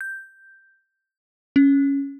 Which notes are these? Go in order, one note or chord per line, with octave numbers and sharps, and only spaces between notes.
G6
C#4